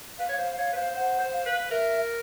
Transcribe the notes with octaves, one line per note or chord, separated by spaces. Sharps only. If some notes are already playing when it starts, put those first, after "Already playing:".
B4 F5
C#5
C5 F5
C#5 F5
B4
C5 F5
C5 F#5
C5
F5
B4
A#4 E5